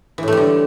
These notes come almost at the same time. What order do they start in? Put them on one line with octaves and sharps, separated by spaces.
E3 A2 A3 G3 D3